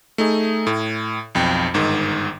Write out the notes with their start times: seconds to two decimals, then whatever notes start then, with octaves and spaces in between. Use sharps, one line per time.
0.18 A3 D#4 G#4
0.67 A2
1.35 B1 F2 G5
1.74 G1 G#2 D#3